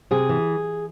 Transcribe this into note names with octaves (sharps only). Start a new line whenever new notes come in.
C3 G#4
E3